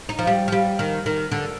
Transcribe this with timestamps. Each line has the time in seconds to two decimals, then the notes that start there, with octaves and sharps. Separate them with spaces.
0.09 D#4
0.19 F3
0.27 G3
0.48 F3
0.52 G3
0.79 D#3
1.06 D#3
1.31 D3